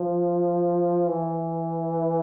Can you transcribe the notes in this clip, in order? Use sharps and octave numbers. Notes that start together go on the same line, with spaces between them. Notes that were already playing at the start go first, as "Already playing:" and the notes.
Already playing: F3
E3